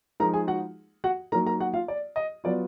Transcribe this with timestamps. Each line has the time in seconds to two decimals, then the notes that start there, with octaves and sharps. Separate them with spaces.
0.20 F3 G#3 D#4 A#4 A#5
0.33 G#4 G#5
0.47 F#4 F#5
1.04 F#4 F#5
1.32 F#3 A#3 D#4 A#4 A#5
1.47 A#4 A#5
1.60 F#4 F#5
1.73 F4 F5
1.88 D5
2.16 D#5
2.44 F#3 B3 F4 D5